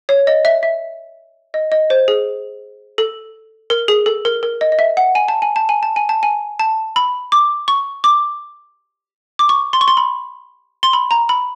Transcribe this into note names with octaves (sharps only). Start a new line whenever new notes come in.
C#5
D#5
E5
E5
D#5
D#5
C5
G#4
A4
A#4
G#4
A4
A#4
A#4
D#5
D#5
E5
F#5
G#5
A5
G#5
A5
G#5
A5
G#5
A5
G#5
A5
B5
D6
C#6
D6
D6
C#6
C6
C#6
C6
B5
C6
B5
A#5
B5